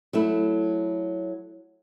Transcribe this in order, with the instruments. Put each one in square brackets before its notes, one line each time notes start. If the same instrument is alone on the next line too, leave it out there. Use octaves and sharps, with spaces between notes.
[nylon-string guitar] F#3 A3 E4